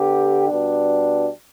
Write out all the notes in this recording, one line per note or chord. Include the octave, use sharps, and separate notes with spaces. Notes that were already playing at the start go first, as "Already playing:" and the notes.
Already playing: D3 B3 G4
B2 G3 D4